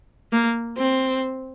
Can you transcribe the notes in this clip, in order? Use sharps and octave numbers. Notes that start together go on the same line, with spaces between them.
A#3
C4